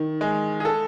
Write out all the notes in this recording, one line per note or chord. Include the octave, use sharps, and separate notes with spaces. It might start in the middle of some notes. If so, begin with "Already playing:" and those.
Already playing: D#3
G#3
G#4
A4